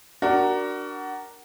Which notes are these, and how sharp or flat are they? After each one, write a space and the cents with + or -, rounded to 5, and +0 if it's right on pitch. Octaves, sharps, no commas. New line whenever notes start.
D4 +0 F#4 +20 A#4 +0